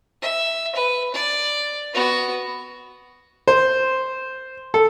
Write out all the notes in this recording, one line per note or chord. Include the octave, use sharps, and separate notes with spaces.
E5
B4
D5
B3 F#4
C5
A4